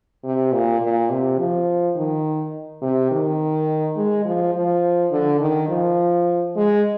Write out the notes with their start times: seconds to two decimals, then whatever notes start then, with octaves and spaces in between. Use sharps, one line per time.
0.24 C3
0.52 A#2
0.81 A#2
1.10 C3
1.39 F3
1.96 D#3
2.82 C3
3.11 D#3
3.96 G#3
4.25 F3
4.55 F3
5.12 D3
5.40 D#3
5.69 F3
6.56 G#3